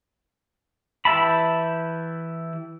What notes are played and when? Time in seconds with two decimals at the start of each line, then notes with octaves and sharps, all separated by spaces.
1.05 E3 G4 E5 A5 B5